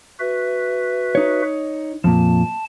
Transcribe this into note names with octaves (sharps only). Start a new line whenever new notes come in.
F#4 B4 E5
D#4 C#5
F2 A#2 A5